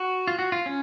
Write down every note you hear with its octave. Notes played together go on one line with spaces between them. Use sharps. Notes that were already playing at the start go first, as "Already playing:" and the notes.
Already playing: F#4
F4
F#4
F4
C#4